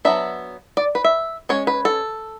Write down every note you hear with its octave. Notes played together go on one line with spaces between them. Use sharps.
F#3 B3 D4 E5
D5
B4
E5
G#3 C#4 C#5
B4
A4